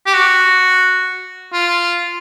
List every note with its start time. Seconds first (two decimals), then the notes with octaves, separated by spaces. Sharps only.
0.06 G4
0.14 F#4
1.53 F4